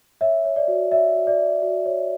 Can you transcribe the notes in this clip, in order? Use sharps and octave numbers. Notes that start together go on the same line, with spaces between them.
C#5 E5
C#5
D5
F#4
C#5 E5
F#4
D5
F#4
F#4
C#5